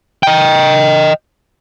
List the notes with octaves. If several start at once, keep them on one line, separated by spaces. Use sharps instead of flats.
D#5 G5